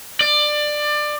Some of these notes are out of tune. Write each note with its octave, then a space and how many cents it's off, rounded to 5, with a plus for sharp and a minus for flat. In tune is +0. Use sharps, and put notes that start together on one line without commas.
D5 +20